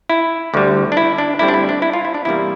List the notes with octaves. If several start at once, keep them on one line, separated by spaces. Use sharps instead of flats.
E4
D2 D3 G3
D4
E4
D4
D2 D3 G3 C4 E4
D4
E4
D4
E4
F4
E4
D4
E2 C3 G3 A#3 E4